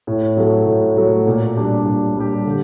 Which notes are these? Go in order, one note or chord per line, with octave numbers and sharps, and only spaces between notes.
A2
F#3 A3
A2
F#3 A3
A#2
G3 D4 G4
A#2
G3 D4 G4
D3